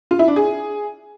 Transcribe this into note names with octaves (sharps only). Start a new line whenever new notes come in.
F4
E4
D4
G#4